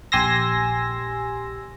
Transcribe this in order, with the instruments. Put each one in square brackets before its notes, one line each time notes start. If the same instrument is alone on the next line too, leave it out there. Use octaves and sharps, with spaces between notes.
[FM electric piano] A#1 G4 G#5 C6 E6 A#6